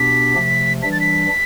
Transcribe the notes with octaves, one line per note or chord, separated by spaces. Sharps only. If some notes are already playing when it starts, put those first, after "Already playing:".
Already playing: B2 B3 D4 G4 B6
C3 F3 A3
E3 G3 D4 B6
A6
B6